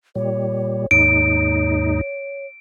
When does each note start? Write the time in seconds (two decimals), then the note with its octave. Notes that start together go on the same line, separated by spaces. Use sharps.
0.15 A#2 G3 C#5
0.91 D#2 G#2 D#4 C#5 D7